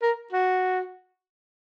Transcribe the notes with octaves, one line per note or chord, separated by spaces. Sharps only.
A#4
F#4